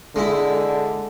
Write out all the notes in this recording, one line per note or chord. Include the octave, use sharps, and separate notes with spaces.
D3 G#3 E4